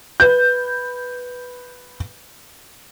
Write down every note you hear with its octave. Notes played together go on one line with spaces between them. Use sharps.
B4 G6